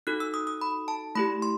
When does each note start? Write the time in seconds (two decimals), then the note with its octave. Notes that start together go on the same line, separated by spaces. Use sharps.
0.07 D#4 F#4 A4 F#6
0.20 E6
0.34 D#6
0.47 D#6
0.61 B5
0.88 A5
1.15 A3 E4 G4 B5
1.42 C6